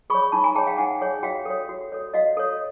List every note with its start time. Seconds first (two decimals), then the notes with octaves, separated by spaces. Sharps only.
0.10 G#4 B5 C#6
0.14 C#5
0.32 D#4 A5 B5
0.44 G#5 A#5
0.55 G#4 C#5 G5 A5
0.67 F5 G5
0.78 D#4 F#5 G#5
1.01 G#4 C#5
1.23 F#4 F5 G5
1.45 A4 C#5
1.69 F#4
1.92 A4 C#5
2.14 F#4 D#5 F5
2.37 A4 C#5